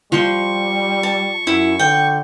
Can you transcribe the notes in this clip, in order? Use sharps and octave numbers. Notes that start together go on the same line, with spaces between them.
F3 G3 C5 C6 C#6
A5
F#2 E4
D3 G5